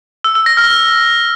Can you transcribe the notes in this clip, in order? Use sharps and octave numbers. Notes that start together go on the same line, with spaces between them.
E6
E6
A#6
F6